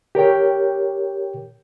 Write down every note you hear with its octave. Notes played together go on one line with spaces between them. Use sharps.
G4 A#4 C#5 G5